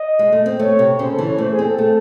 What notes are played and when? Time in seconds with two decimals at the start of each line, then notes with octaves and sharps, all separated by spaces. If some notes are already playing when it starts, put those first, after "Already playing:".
Already playing: D#5
0.19 G#3
0.32 A3
0.46 C4
0.59 A3 C#5
0.79 C3
0.99 C#3 C5
1.12 A4
1.19 E3
1.26 C#5
1.38 A3 C5
1.51 G#4
1.59 C4
1.65 A4
1.78 A3 A4